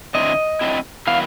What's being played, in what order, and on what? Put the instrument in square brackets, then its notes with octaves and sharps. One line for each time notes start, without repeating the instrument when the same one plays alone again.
[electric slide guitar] D3 F#3 A3 C4 E4 [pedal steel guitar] D#5
[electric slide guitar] D3 F#3 A3 C4 E4
[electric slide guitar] D#3 F#3 B3 E4 [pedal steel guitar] F5